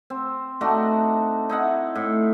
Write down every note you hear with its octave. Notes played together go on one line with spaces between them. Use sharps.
C4
A3 D4 D#4 F#4
D#4 E4 F#5
A2